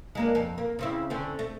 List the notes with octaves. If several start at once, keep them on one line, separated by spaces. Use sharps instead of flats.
G#3 A#3 D4
F2
A#3
C#3 C4 E4
D3 C4 C#4
A3